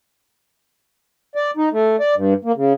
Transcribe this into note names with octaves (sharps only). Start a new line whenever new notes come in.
D5
D#4
A3
D5
G2
A#3
C#3